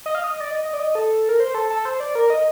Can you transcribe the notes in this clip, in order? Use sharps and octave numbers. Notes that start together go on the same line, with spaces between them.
D#5
F5
D#5
D5
D#5
D#5
D5
D#5
A4
A#4
C5
A4
A4
C5
D5
A#4
D#5